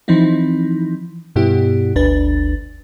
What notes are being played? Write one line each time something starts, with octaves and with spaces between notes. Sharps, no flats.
E3 F3 C4 D#4 E4
G2 B2 B3 E4 G4
G1 D2 D4 B4 A6